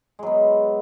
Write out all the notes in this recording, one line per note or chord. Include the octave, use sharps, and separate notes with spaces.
F#3 G#3 B3